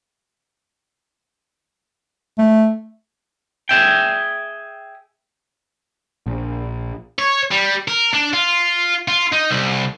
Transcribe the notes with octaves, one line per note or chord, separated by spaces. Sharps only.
A3
G#4 E5 G5
A#1
C#5
G3
A#4
D4
F4
F4
D#4
C2